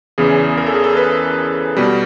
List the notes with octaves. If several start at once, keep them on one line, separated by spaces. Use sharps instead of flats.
E2 C#3 E3 G#4
A#4
A4
G#4
A4
B4
B2 G3